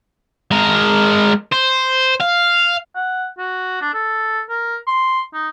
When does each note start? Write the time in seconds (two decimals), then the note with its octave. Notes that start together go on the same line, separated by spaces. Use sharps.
0.51 G#3 A#4
1.53 C5
2.21 F5
2.95 F#5
3.38 F#4
3.81 D4
3.94 A4
4.49 A#4
4.87 C6
5.33 D#4